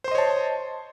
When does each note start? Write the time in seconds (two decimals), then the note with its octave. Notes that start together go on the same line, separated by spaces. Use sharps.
0.04 C5
0.08 C6
0.11 D#5
0.15 C#5
0.18 A5